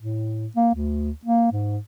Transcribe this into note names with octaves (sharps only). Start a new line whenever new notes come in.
A2
A#3
D2
A#3
G#2